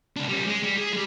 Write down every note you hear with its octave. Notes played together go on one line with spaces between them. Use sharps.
C#2 D4
G3 C#4
G#3
G3
G#4
G3 G#3